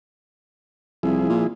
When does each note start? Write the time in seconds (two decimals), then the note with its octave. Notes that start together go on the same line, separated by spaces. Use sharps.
1.03 C2 F3 E4 G#4
1.29 A#2